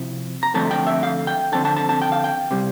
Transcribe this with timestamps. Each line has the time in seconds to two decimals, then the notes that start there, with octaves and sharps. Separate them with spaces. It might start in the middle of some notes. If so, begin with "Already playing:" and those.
Already playing: C3 F3 C4 E4
0.43 A#5
0.54 D3 F3 A3 C4 A5
0.71 G5
0.87 E5
1.03 F5
1.27 G5
1.52 D3 F3 C4 A5
1.65 A5
1.77 A5
1.89 A5
2.02 G5
2.12 F5
2.24 G5
2.51 C3 G3